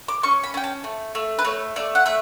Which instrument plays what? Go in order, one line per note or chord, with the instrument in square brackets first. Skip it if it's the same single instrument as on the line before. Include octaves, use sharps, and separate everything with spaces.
[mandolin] D6
C#4 C#6
B5
C#4 G5
A5
A3
A3
B4
A3 C#5
A3 D5
F#5
A3 E5